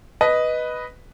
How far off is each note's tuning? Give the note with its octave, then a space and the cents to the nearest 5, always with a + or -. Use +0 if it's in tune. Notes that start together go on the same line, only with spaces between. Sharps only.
B4 +0 D#5 +0